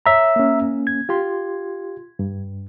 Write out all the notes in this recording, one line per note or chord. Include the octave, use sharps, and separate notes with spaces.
C#5 E5 A#5
A#3 C#4
G#6
F4 G4 C6
G2